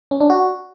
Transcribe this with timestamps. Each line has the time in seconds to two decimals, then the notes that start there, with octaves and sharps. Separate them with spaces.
0.11 C#4
0.20 D4
0.30 F#4